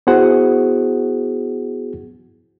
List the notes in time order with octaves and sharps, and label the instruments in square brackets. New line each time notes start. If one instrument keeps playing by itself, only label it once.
[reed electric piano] B3 E4 F#4 G#4 C5 F#5